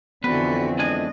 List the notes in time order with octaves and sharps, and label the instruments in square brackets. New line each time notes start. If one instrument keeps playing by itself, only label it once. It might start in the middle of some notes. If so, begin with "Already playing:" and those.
[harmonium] F2 E3 C4 [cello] D3 F#4 [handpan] B3 [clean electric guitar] B4
[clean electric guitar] G#3 D4 G#5 [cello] D#5